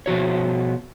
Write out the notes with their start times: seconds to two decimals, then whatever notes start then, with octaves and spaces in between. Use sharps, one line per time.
0.06 B2 F3 F#4 C#5